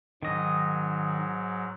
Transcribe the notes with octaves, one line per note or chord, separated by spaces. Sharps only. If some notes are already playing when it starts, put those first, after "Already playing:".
G#2 D#3 F#3 D#5